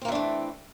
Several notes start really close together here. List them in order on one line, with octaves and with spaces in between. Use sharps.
C4 A#3 E3 D4 A3